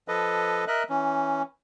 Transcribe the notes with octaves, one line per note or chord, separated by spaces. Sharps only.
F3 A4 B4 D#5
A#4 D#5 E5 F#6
E3 C#4